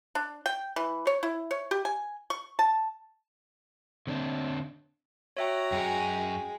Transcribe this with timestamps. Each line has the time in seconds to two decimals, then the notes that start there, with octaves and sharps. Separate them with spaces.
0.15 D4
0.46 G5
0.76 E3
1.07 C#5
1.23 E4
1.51 C#5
1.71 G4
1.85 G#5
2.30 C#6
2.59 A5
4.07 D3 C4 D4
5.37 F#4 C#5 E5 G5 A#5
5.72 F#2 G#3 C#4 G5